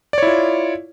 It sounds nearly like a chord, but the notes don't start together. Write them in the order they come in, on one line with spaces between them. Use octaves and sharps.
D5 C#5 E4 F4